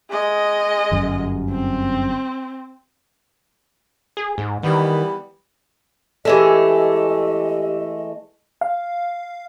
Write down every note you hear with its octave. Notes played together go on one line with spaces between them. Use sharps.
G#3 D#5
G1 F#2
C4
G#4
G#2
D#3 E3 G3 B3
E3 G#3 A3 G4 A4 D#5
F5